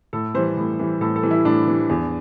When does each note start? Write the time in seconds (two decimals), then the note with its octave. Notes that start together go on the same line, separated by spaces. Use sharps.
0.13 A2 A4
0.34 E3 G3 C5
0.57 A2
0.79 E3 G3
1.01 A2 A4
1.16 A4
1.23 E3 G3
1.31 E4
1.45 A2 D4
1.67 E3 G3
1.89 E2